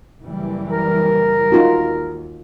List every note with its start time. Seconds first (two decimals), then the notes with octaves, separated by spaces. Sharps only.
0.22 F#1 E3 G3
0.71 A#4
1.52 D#2 D#4 F4 F#4